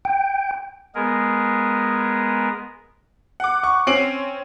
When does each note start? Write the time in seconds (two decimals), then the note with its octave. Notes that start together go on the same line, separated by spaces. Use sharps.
0.05 G5
0.95 G#3 B3 G#4 A#4
3.40 F#5 D6
3.63 C#6
3.87 C4 C#4 C7 D7 F#7